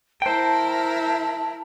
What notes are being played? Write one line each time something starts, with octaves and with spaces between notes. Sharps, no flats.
E4 A#4 C5 G5 A5